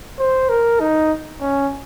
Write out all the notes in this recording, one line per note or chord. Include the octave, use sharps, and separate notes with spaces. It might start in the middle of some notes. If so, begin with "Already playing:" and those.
C5
A#4
D#4
C#4